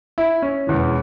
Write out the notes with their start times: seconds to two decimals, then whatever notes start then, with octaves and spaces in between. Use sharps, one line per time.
0.18 E4
0.42 C#4
0.67 E1 E2 E3